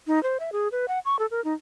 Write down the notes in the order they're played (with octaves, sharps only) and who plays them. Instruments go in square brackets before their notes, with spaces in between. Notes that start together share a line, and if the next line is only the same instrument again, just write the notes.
[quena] D#4
C5
E5
G#4
B4
F#5
C#6
A4
A#4
D#4